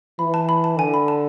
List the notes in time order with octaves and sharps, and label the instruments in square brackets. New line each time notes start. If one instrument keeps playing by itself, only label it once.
[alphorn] E3 [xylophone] B5
[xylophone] A5
B5
A5
[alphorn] D3 [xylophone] G#5
[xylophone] B5
A5